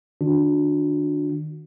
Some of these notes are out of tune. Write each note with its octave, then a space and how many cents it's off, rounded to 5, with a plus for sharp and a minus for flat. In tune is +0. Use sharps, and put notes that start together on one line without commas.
D#3 -10 D4 +0 F#4 -35